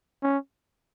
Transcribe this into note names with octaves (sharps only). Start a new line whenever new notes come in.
C#4